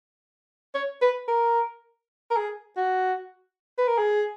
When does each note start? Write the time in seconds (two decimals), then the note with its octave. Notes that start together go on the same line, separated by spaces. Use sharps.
0.75 C#5
1.02 B4
1.28 A#4
2.31 A#4
2.37 G#4
2.77 F#4
3.78 B4
3.88 A#4
3.98 G#4